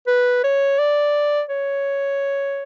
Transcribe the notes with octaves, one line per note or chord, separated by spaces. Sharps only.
B4
C#5
D5
C#5